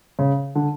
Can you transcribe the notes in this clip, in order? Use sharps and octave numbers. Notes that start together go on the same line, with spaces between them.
C#3
D3